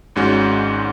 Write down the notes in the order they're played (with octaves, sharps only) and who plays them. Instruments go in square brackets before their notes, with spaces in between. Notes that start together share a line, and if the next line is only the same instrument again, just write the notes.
[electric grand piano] G#1 G#2 G#3 C#4 F#4